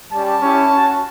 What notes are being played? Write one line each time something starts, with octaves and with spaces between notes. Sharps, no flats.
G3 C#4 G4 A5
C#4 E4 G4
C#4 F#4